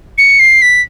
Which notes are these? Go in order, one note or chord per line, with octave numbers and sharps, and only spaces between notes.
C#7
C7
B6